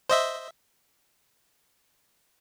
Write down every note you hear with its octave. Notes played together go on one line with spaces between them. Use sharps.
C5 D#5 E5